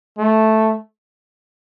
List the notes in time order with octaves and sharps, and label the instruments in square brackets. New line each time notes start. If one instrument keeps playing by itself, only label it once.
[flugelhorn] A3